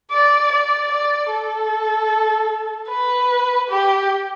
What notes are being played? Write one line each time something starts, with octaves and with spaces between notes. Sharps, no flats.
D5
D5
D5
A4
B4
G4